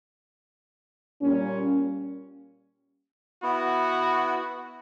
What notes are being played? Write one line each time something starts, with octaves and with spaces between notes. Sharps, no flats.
A#2 G3 A#3 C#4
B3 E4 F#4